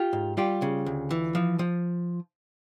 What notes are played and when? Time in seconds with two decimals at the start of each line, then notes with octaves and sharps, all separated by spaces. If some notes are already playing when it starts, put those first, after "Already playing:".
Already playing: F4 G4
0.13 G#2
0.37 G3 F4 G4
0.62 C#3
0.86 D2
1.11 E3
1.35 F3
1.59 F3